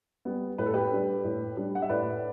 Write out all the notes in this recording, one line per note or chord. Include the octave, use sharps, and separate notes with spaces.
G3 B3
A2 B4
A4
G4 B4
G3 D4
A2
G3 D4
F#5
E5
A2 B4 D5